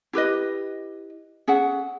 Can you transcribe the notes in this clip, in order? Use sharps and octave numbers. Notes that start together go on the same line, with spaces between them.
E4 G4 B4 D#5
C#4 G#4 E5 F#5